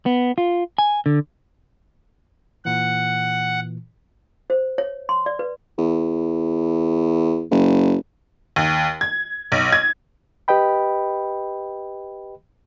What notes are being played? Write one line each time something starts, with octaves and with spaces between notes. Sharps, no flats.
B3
F4
G#5
D3
A#2 E3 F#5
C5
C#5
C6
D5
B4
E2
F#1
D#2
G#6
B1
G#6
G4 B4 D#5 G5 B5